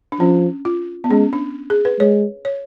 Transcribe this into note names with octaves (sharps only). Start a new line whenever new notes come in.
D4
F3 C#4
F4
B3
G#3 C#4
D4
G#4
B4
G#3 C#5
C#5